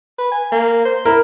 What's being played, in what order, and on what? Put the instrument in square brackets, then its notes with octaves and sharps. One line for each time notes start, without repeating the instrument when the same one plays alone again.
[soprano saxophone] B4
G#5
A#3
C5
[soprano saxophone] E4 [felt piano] A#4